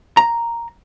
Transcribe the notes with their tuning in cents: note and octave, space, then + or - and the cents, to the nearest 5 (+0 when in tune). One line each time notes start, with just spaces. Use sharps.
A#5 +0